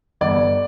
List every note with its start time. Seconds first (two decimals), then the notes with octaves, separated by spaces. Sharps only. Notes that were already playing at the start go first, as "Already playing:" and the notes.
0.21 G1 D5